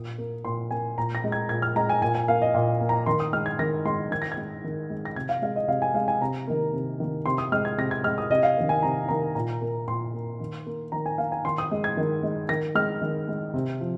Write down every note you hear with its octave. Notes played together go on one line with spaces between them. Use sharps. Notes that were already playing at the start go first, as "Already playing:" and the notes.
Already playing: A#2 D#6
A#3
A#2 C6
A#3 G#5
A#2 A#5
A#6
G#3
G#6
A#2 G#6
F6
G#3 A#5
G#5
A#2 G#5
G#5
A#3 F5
D#5
A#2 F5
A#3
A#5
D#3 C6
D#6
G#3 F6
G#6
D#3 A#6
G#3 C6
D#3 G#6
A#6
G#6
G#3
D#3
G#3
A#6
C3 G#6
F5
G#3 F5
D#5
C3 F5
G#5
G#3 F5
G#5
C3 A#5
D#3 A#3
C3
D#3 A#3
C3 C6
D#6
G#3 F6
G#6
C3 A#6
G#6
G#3 F6
D#6
C3 D#5
F5
D#3 A#3
G#5
C3 A#5
D#3 A#3 A#5
A#2 A#5
A#3
A#2 C6
A#3
D#3
A#3
D#3 A#5
G#5
A#3 F5
G#5
D#3 C6
D#6
G#3
G#6
D#3
G#3
D#3 A#6
G#3 F6
D#3
G#3
C3
F3